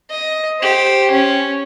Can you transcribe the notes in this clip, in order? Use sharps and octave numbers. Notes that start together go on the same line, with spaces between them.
D#5
G4 C5
C#4